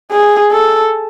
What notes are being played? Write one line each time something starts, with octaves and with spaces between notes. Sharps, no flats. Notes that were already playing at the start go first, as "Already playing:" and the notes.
G#4
A4